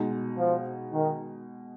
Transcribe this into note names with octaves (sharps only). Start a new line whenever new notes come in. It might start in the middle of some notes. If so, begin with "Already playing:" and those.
Already playing: B2 G#3 D#4
F3
D#3